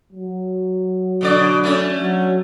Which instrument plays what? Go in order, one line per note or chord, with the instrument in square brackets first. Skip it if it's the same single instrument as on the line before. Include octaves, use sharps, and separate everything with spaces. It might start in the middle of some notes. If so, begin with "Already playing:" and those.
[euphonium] F#3
[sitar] B2 D3 D5
A3 C#4
[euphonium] F#3